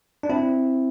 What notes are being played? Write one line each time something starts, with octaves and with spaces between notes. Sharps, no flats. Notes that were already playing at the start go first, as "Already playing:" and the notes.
D4
C4 E4